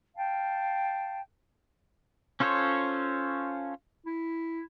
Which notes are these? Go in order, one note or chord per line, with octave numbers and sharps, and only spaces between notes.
F5 G5 A5
C#4 F4 A4 C5 C#5
E4